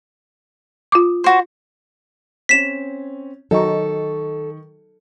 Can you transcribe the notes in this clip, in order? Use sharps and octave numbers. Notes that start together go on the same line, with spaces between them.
F4 D6
F#4 C5
C4 C#4 B6 E7
D#3 F#3 D#4 A4 C#6